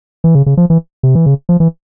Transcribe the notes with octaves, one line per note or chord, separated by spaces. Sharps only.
E3
C#3
C#3
F3
E3
C3
E3
C#3
F3
E3